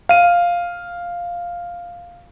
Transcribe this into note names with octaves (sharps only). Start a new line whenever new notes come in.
F5 D#7